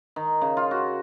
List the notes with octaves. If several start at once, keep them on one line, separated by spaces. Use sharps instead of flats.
D#3
C#3
F4
F#4